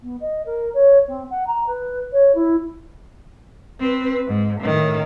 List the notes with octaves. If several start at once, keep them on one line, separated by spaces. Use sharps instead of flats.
B3
D#5
A#4
C#5
C4
F#5
A#5
B4
C#5
E4
C4 B4
G#2
A2 D#3